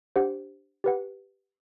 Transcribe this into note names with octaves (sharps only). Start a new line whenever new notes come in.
D4 G4 C5 F#5
G4 B4 F#5